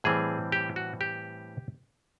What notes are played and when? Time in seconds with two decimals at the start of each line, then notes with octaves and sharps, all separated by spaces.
0.04 A2 E3 G3 C4 G#4
0.52 G4
0.76 F#4
1.01 G4